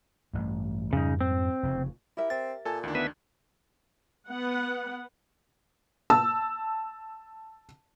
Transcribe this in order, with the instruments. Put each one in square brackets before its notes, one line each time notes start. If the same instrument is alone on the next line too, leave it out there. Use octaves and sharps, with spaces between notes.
[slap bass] A1 G2
[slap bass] F2 G#2 G3 [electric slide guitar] C#3 D#4
[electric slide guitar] C4
[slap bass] F1 A#2 C#3
[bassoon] E4 [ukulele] G4 A#4 E5
[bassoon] C4 [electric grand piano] A6
[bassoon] A#2 [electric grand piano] A4 G#5 A5
[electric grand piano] D2 D#3 D4
[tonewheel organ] B3 B4 E5
[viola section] B3 F#5
[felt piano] A5 E6